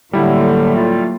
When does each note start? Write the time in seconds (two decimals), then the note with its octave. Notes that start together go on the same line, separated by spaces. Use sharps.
0.13 A2 D3 F#3 G3 A#3 E4
0.75 A3 F4